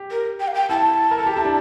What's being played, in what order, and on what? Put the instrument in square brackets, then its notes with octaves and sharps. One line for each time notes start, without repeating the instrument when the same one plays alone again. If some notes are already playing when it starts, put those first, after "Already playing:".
Already playing: [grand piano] G4
[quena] A#4
G5
F5
G5
[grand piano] E4 [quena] A5
[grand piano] A#4
A4
G4
E4
D4